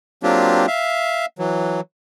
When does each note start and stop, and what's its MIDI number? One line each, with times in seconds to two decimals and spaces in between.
0.23 0.66 54
0.23 0.66 58
0.23 0.66 60
0.23 0.66 62
0.23 0.66 65
0.23 0.66 67
0.67 1.26 76
0.67 1.26 77
1.39 1.81 52
1.39 1.81 54